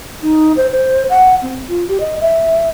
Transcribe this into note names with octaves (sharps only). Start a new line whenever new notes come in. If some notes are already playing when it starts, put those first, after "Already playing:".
D#4
C5
C5
F#5
C4
F4
G4
D#5
E5